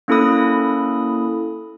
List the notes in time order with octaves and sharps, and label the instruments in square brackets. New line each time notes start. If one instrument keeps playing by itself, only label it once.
[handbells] A#3 C#4 E4 A4 B5 D#6